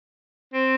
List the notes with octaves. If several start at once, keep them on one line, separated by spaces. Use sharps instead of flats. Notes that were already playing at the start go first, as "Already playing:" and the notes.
C4